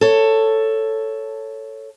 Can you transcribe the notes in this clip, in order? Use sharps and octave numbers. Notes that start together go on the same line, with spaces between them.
A4 C#5